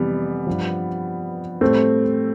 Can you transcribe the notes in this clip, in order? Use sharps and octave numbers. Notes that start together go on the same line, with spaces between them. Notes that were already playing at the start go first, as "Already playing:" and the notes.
Already playing: F2 C3 E3 G3 B3
G2 F3
A2 G3 A3 C4